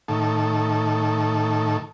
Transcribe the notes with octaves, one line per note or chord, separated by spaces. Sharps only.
A2 D#3 A4